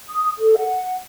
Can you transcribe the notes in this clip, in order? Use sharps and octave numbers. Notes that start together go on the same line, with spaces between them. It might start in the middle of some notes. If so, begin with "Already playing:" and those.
D#6
A4
F#5